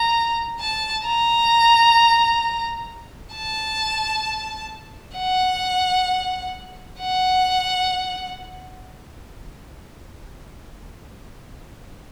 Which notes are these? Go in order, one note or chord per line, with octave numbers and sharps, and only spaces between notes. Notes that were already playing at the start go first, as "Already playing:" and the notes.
Already playing: A#5
A5
A#5
A5
F#5
F#5